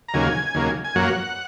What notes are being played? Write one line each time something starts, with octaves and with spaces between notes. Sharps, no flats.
A#5
D#2 C#3 F#3 A#3 G#5
D#2 C#3 F#3 A#3
G#5
F#2 F#3 A#3 F#5